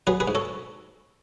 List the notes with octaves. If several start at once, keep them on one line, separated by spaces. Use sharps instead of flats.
F#3 G#4 B4
G#4 B4
G#2
A4 C#5